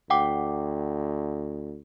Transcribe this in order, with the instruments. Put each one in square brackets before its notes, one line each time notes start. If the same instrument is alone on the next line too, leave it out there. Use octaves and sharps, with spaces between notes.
[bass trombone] D2 [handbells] F#5 G5 D6